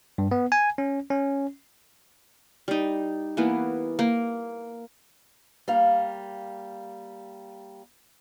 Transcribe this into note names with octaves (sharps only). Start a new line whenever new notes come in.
G2
B3
G#5
C#4
C#4
G3 D#4
E3 A#3 B3
A#3
G3 A#3 F5